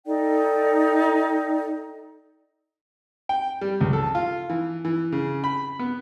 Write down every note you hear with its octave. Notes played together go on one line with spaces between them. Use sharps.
D#4 A4 D5 G5
G5
G3
C#2
A4
F4
E3
E3
C#3
B5
B3